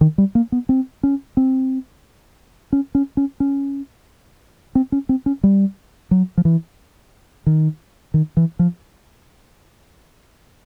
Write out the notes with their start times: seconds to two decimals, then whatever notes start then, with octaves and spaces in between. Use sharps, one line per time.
0.01 D#3
0.18 G3
0.35 A#3
0.52 B3
0.69 C4
1.03 C#4
1.37 C4
2.73 C#4
2.95 C#4
3.17 C#4
3.40 C#4
4.75 C4
4.92 C#4
5.09 C4
5.26 C#4
5.43 G3
6.11 F#3
6.38 F3
6.45 E3
7.47 D#3
8.14 D#3
8.37 E3
8.59 F3